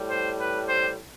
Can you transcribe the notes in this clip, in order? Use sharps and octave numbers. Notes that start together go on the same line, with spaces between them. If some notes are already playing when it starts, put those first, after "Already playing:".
Already playing: A2 G3
C5
B4
C5